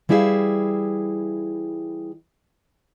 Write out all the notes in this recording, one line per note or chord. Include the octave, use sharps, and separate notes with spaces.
E3 G3 E4 G#4 E5 F5